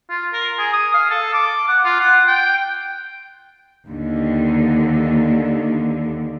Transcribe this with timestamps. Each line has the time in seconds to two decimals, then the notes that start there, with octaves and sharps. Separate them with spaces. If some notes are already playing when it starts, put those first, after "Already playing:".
0.10 F4
0.33 A#4
0.59 G#4
0.73 D#6
0.94 F5
1.11 A4
1.34 D6
1.68 F#5
1.84 F4
2.00 F#5
2.28 G5
3.87 D#2 D3